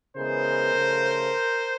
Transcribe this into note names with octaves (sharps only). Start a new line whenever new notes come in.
C#3 E3 G#3 B3 A#4 C5
C#3 F3 A3